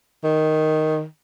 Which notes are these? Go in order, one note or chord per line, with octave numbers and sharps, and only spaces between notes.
D#3